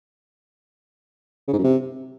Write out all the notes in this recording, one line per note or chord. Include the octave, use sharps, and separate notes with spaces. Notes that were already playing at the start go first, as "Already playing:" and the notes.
C#3
G#2
F#2
C3